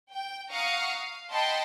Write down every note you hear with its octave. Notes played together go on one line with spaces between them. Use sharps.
G5
F5 F#5 A#5 C#6 D#6 F6
F5
D#5 F#5 G5 A5 B5 C6